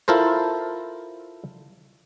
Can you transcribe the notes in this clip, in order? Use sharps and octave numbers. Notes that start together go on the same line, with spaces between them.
E4 F4 A4 A#4 C5